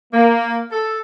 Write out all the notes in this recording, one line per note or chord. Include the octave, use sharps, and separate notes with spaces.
A#3
A4